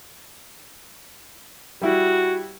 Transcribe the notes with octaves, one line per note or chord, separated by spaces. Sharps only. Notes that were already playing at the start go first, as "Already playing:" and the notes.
G3 E4 F#4